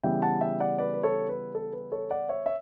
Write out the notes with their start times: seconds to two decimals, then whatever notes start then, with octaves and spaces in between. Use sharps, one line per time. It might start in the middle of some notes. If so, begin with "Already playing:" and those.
0.03 C#3 E3 G3 B3 E5 G5
0.22 F#5 A5
0.41 E5 G5
0.60 D5 F#5
0.78 B4 D5
0.94 B4
1.03 A4 C#5
1.29 B4
1.55 A4
1.73 B4
1.92 A4 C#5
2.11 D5 F#5
2.29 C#5 E5
2.46 E5